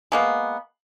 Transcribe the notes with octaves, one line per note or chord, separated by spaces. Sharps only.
G#3 A#3 B3